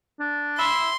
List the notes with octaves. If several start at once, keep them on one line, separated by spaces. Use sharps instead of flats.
D4
E4 E5 C6